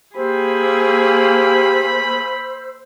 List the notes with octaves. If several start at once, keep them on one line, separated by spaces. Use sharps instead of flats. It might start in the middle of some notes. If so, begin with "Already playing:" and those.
A#3 G4 G#4 C5 B5 E6